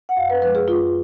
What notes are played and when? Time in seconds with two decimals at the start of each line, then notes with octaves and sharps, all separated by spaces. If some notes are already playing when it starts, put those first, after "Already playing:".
0.09 F#5
0.17 F#2 F5
0.30 B4
0.42 F3 B4
0.46 G#3
0.55 G#4
0.67 F#2 F4